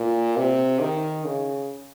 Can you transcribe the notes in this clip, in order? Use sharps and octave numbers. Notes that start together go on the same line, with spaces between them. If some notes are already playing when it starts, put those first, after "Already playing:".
Already playing: A#2
C3
D#3
C#3